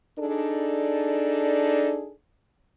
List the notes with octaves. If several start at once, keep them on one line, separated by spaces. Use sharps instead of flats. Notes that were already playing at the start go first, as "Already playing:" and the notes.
D4 D#4 G#4 A4 D5